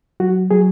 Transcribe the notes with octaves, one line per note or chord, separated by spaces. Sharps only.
F#3 F#4
F#3 G#4